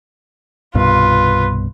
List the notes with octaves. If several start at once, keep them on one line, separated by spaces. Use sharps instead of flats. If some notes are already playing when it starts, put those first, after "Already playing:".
C2 G2 B2 F4 B4